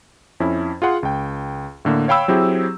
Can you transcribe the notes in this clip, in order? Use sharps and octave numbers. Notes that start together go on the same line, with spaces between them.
F2 C#4 E4
F4 G#4 F#5 C6
C#2 G5
A2 D3 A#3
C#5 F5 G5 B5 E6
F#3 C4 E4 G4 G#4